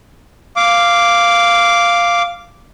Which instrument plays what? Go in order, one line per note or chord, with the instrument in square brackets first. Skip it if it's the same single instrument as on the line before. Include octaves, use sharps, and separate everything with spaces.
[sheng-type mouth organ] F5 D6